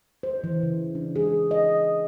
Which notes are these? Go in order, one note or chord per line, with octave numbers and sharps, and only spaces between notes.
C5
E3
C#3
D4
G#4
D#5